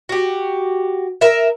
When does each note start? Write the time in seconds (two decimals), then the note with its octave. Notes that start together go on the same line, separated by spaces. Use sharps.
0.09 F#4 G4
1.21 A#4 E5